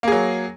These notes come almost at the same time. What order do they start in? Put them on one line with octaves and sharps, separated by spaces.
A#3 G#4 F#3